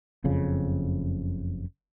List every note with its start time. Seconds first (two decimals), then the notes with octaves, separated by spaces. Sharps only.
0.24 F#1 F2 C#3